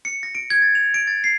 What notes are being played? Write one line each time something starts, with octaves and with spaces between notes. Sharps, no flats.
C#7
A#6
D7
G#6
A6
F7
D7
A6
C7